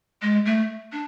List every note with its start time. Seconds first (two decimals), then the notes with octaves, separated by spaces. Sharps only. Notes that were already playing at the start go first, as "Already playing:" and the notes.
0.22 G#3
0.46 A3
0.92 D4